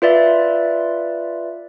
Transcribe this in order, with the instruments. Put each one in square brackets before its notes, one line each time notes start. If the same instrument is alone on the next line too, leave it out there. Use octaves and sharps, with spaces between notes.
[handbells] F4 B4 D5 E5